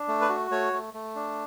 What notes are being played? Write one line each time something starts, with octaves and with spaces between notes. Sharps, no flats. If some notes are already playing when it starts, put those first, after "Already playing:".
Already playing: D4
A3
B4
F#4
A3 C#5
A3
A3
D4